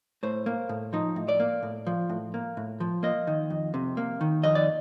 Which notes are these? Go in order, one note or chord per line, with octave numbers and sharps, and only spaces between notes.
A2 C5
A#3
A2
F3 D#4
A2
D5
A#3
A2
F3
A2
A#3
A2
F3
A#3 D#5
D#3
F2
C3
A#3
D#3
F2 D#5
D5